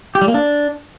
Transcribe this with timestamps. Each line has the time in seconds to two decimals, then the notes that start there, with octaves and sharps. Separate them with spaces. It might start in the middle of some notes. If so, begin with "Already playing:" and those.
0.15 G4
0.22 G3
0.28 A#3
0.34 D4